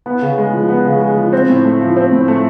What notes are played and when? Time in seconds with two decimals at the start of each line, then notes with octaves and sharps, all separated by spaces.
0.06 B3
0.22 C#3
0.38 G#3
0.53 F3
0.69 B3
0.85 C#3
1.01 G#3
1.17 F3
1.33 C4
1.49 A2
1.65 A3
1.81 F3
1.96 C4
2.12 A2
2.28 A3